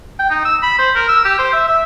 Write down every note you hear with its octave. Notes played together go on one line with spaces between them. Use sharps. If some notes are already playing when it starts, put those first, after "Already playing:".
G5
D#4
E6
B5
C5
A#4
E6
G4
C5
E5
E5